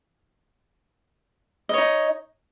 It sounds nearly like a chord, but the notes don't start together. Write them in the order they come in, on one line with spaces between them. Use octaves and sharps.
D#5 C#5 D#4